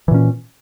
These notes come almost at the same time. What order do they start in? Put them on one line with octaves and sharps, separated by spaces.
E3 A#2 C#4